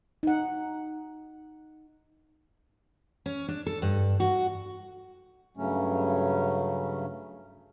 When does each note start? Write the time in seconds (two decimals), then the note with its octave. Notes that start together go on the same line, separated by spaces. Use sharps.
0.23 D#4 F#5
3.26 C#4
3.48 D4
3.67 A4
3.82 G2
4.20 F#4
5.57 G2 C#3 F#3 A3 C#4